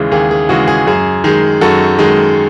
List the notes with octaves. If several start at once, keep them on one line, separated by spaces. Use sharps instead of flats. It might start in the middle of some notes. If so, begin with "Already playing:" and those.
Already playing: D#2 C#3 E3 G#3
D#2 G#4
G#4
C#3 E3 G#3 F#4
G#4
F#2 G#4
D#3 G#3 G#4
F#2 F#4 A4
D#3 G#3